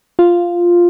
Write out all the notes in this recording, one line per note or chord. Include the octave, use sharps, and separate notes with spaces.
F4